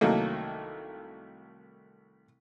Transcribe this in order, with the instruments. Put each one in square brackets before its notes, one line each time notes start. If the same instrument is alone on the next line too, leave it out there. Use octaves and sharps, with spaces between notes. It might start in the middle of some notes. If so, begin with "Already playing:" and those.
[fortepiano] C2 D#3 F#3 A3 A#3